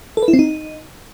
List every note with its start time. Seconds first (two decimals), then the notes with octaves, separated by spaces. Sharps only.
0.17 A4
0.23 B4
0.28 E4
0.33 C4
0.39 D#4